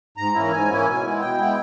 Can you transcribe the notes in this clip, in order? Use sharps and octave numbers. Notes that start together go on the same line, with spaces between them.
G#2 A#5
E3 A#3 C#4 E4
G#2 G#5
E3 A#3 C#4 E4
B2
G#3 B3 E4
B2 G5
G#3 B3 E4